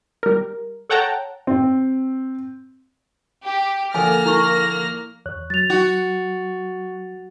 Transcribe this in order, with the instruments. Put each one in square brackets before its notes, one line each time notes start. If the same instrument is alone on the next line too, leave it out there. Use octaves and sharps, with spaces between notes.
[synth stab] G3 A#4
A4 C#5 F#5 G5 A5 A#5
[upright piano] C4
[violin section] G4
[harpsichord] D3 F3 [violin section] A#3 F6 A#6 [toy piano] A4 G#5
[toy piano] E4 C#6
[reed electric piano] E2 C#5 F#6
[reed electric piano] F#3 [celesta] A6 F7
[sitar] F#4